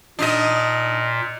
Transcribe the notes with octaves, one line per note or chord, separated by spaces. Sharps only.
A#2 D4 D#4 D#5